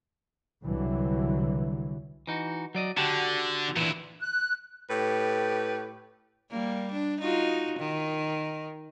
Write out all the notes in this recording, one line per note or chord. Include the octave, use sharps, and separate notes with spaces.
C2 D3 E3 F#3
E3 D#4 F#4
F#3 D5 D#5
D3 F#4 G4 A5
A#2 E3 D4 E4
F#6
A2 G4 B4
G3 A#3
D4
D#4 F4 F#4
D#3